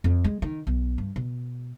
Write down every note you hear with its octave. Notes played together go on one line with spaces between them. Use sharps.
F2
G#3
D#3
B1
G2
B2